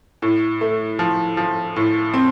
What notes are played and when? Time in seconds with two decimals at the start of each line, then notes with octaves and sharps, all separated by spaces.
0.22 A2
0.61 A3
0.99 F3
1.37 F3
1.76 A2
2.14 C4